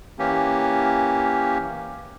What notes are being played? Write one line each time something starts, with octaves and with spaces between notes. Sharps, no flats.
E3 A#3 C#4 G4